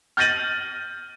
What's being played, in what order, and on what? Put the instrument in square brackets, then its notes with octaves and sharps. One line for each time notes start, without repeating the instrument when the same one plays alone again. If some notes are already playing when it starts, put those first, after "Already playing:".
[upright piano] F6 G6 A6 A#6 D#7 F#7